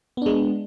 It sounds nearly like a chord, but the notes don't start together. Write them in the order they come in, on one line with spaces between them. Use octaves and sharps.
B3 D4 G#3